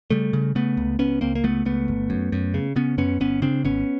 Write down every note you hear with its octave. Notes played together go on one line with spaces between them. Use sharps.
C#3 G3 A3
C#3
C#3 A3 B3
C#2
C#2 B3 C#4
C#2 A#3 C4
A#3
C#2 A3 B3
C#2 A3 B3
G1
F#2
F#2
C#3
C#3 B3 C#4
F#2 B3 C#4
G1 B3 C#4
C#3 C4 D4
G#1 B3 C#4